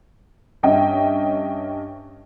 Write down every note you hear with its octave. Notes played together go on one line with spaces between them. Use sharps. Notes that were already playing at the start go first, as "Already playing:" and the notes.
G2 C#4 D#5 E5 G5